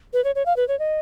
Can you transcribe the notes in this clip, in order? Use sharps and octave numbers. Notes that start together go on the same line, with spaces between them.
B4
C#5
C#5
F5
B4
C#5
D#5